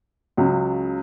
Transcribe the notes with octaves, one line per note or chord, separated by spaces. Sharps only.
C#2 C#3 F#3